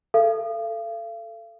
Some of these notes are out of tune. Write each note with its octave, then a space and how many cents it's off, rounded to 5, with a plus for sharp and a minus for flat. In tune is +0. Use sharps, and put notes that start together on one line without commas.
A4 +0 F5 -40